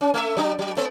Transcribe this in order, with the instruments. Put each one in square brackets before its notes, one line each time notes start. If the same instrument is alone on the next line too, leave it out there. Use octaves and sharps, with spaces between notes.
[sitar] C#4
A3 E5
F#3 D4
F#3
A3 B3